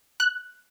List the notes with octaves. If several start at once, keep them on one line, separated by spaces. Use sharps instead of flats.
F#6